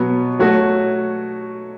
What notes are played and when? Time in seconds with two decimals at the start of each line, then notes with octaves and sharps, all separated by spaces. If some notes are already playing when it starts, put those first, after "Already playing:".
Already playing: B2 F#3 B3
0.39 F#3 A3 F#4 C#5